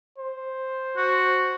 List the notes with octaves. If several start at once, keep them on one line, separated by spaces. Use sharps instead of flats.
C5
F#4